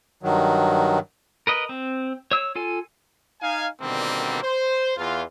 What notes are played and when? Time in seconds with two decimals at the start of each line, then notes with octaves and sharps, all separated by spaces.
0.23 G2 D#3 F#3
1.47 A#4 B4 D#5
1.69 C4
2.31 C#5 E6
2.55 F4 A4 G#5
3.41 D#4 F5 G#5
3.81 B2 D3 D#3 G3 A#3 C4
4.42 C5
4.97 E2 F4